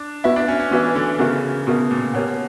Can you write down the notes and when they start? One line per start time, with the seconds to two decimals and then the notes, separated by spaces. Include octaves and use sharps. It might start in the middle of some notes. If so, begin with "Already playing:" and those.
Already playing: D4
0.24 B3 E4 F#4 B4 E5
0.36 D4
0.48 C#4
0.59 C#4
0.71 E3 B3 F#4 B4 E5
0.95 D3
1.19 C#3 B3 F#4 A#4 E5
1.67 B2 B3 F#4 A#4 E5
1.91 A#2
2.14 B2 G4 A#4 C#5 F#5